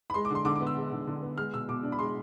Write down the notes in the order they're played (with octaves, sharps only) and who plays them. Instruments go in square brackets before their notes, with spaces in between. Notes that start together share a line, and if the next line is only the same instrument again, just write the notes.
[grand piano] B5
G#3 C6
D6
D3 C6
D3 D6
D6
B3
E6
G#3
D3
D3
B3
G#3 F6
B2 E6
B2 D6
D4
B5
G#3 C6